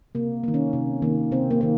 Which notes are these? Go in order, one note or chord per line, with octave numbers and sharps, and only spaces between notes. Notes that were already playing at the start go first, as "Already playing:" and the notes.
C3 A#3
D#3 A#3
C#4
C3
D#3 A#3
C3 C4
A#3
D#3 A#3